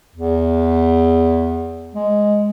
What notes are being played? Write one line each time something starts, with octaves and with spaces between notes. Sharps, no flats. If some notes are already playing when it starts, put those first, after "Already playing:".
E2
G#3